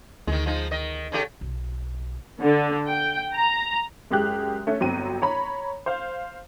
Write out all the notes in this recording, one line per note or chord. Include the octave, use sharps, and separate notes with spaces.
D2 D#3 G#3
F3 G#3 D#4
D#3 D#5
C#3 A3 G4
B1
D3
G5
A#5
F#2 G#3 G4 F#6
A3 C#4
G1 F#3 C4 D#7
C#5 A#5 B5
C5 F5